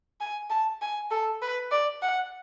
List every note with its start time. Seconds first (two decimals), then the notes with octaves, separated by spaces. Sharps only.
0.21 G#5
0.50 A5
0.82 G#5
1.11 A4
1.42 B4
1.72 D5
2.02 F#5